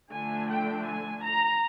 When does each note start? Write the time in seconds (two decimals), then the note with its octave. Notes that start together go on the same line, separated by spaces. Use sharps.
0.11 D3 F3 A3 D4 G#5
0.49 G5
0.86 G#5
1.23 A#5